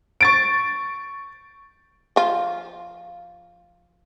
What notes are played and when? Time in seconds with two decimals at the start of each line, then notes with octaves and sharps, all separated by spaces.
0.21 C#6 A6 D7
2.16 F3 F4